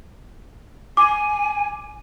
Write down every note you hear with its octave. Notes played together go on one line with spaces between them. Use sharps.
G#5 D6